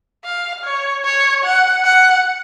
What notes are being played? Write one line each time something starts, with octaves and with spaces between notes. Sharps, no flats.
F5
C#5
C#5
F#5
F#5